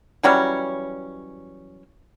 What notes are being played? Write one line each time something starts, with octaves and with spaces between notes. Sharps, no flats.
E3 F#3 G3 C#4